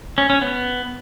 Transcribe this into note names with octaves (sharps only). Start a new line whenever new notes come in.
C#4
C#4
B3